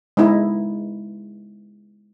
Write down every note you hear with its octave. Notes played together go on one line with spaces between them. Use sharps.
G#3 B3 D#4 E4